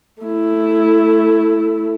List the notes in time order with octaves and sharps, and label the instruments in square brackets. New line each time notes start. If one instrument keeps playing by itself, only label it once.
[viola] A3 E4